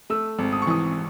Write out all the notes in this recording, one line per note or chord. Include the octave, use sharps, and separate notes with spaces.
A3 E6
G#1
D#6
C#6
E3 D#6